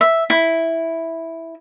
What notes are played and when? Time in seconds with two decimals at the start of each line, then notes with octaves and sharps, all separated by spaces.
0.01 E5
0.30 E4